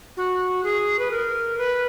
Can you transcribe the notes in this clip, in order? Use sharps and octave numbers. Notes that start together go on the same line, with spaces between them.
F#4
G#4
B4
A#4
B4